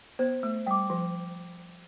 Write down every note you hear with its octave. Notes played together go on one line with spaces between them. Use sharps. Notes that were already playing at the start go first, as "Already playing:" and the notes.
B3 C5
A3
G3 G5 D6
F3